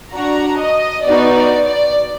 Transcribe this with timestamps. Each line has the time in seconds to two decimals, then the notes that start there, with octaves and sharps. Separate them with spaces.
0.13 D4 F#4 A#5
0.60 D#5
1.05 B3 D#4 F#4 D5
1.36 D5
1.67 D5